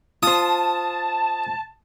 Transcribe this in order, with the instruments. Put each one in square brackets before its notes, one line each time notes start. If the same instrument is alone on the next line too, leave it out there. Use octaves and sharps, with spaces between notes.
[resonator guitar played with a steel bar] F4 C5 [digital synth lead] A5 [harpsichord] D#6